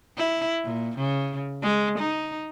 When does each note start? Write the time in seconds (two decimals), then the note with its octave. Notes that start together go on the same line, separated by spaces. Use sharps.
0.17 E4
0.64 A#2
0.98 C#3
1.63 G#3
1.98 D#4